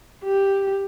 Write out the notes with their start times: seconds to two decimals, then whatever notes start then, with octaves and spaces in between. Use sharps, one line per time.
0.24 G4